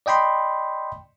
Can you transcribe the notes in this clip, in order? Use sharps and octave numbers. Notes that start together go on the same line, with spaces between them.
D5 D#5 G5 B5 C6